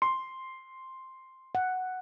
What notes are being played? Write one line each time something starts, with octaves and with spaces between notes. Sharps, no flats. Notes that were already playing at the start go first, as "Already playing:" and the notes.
C6
F#5